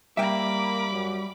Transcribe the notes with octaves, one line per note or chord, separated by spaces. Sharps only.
G3 A#3 E5 G5 B5 D6
F#2